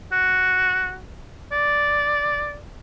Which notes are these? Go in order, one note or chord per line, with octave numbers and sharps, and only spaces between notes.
F#4
D5